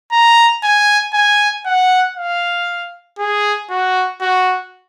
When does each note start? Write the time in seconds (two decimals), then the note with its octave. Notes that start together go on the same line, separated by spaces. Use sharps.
0.12 A#5
0.63 G#5
1.13 G#5
1.65 F#5
2.17 F5
3.19 G#4
3.70 F#4
4.21 F#4